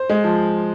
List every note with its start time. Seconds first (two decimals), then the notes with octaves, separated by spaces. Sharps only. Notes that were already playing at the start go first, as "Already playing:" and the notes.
Already playing: C5
0.09 G#3
0.24 F3